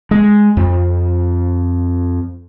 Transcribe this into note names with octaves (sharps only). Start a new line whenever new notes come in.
G#3
F2